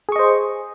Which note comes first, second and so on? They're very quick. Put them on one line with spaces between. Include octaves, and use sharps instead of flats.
G#4 C#6 D#5 C5